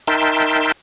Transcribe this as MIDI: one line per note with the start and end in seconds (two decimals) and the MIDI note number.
0.07 0.72 63
0.07 0.72 70
0.07 0.72 76
0.07 0.72 79
0.07 0.72 81
0.07 0.72 84